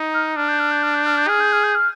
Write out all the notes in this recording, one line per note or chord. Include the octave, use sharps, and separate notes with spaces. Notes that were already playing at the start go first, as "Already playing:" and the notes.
Already playing: D#4
F6
D4 F6
G6
F6
G6
F6
G6
F6
G6
G#4 F6
G6
F6
G6
F6